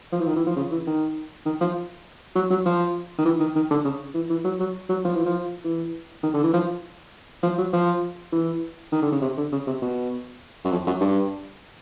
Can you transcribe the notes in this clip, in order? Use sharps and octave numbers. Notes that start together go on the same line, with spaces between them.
F3
E3
D#3
E3
F3
C#3
E3
D#3
D#3
F3
F#3
F#3
F3
D#3
E3
D#3
D#3
D3
C#3
E3
E3
F#3
F#3
F#3
F3
E3
F3
E3
D#3
D3
E3
F3
F3
F#3
F3
E3
D#3
D3
C#3
C3
D3
C#3
C3
B2
F#2
F2
F#2
G2